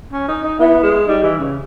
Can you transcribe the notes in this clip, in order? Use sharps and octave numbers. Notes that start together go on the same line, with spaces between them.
C#4
D#4
D#4
B3 E4
G#3
G3 D#4
E3
C#3